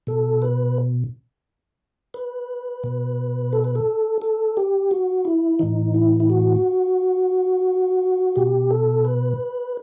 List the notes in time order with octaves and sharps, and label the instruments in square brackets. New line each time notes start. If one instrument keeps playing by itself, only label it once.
[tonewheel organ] B2 A4
B4
B4
B2
A4
B4
A4
A4
G4
F#4
E4
A2 E3 D#4
E4
E4
F#4
B2 G4
A4
B4